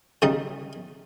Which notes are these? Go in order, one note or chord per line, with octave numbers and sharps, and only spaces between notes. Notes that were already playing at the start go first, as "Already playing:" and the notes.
C#3 G3 D#4